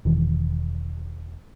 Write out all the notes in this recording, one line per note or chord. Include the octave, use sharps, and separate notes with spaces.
E1 D#3 E3